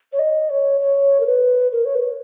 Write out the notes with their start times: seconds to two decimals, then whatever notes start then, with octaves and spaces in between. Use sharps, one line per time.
0.12 C#5
0.19 D#5
0.49 C#5
0.80 C#5
1.20 A#4
1.26 B4
1.72 A#4
1.85 C#5
1.95 B4